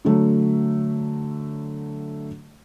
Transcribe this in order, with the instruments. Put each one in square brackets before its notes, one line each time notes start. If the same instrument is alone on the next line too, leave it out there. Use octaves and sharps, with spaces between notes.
[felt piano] D3 F#3 A3